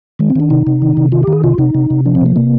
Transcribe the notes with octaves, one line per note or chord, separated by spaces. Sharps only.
D#3 G#3
C4
D#3 D4
C3 D#4
C3
D#3
C3
D#3 F4
G4
D#3
G#4
C3 F4
C3 D#4
C3
C3
F3 D4
C4
C3 A#3
C3 A#3